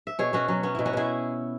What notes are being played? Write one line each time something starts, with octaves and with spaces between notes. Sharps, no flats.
E5
B2 G#4 C#5
B2 C#4 F#4
F#3 C#4
B3 C#4
B2 E4
C#4 F#4
B2 E4 G#4